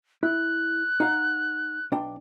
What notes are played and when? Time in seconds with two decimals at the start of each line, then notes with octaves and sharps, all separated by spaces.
0.23 E4 F#6
1.00 D#4 F5 F#5
1.92 B1 D4 G5